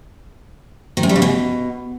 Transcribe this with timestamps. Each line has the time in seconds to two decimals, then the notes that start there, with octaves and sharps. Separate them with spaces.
0.97 D#3
1.03 F#2
1.09 G3
1.16 C#3
1.22 B2